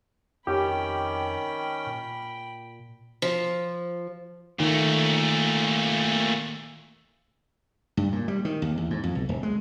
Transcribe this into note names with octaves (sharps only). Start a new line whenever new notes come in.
F2 D#3 C#4 G4 G5 B5
A#2
F3
A#2 D#3 A3
G2
A#2
G3
D#3
D#2
E2
G#2
F2
B1
D1
G#3